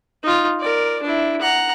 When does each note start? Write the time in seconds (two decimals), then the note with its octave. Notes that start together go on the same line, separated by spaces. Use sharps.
0.23 D#4 F4
0.60 A#4 D5
1.02 D4 E4
1.41 F#5 A#5